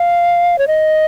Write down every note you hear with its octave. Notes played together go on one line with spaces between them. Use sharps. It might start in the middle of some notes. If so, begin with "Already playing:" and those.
Already playing: F5
C#5
D#5